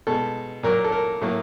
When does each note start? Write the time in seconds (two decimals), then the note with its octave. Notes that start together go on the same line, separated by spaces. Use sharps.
0.07 B2 G#3 A4
0.63 A#2 F#3 A#3 A#4
0.84 A4
0.92 A#4
1.22 A2 F#3 A#3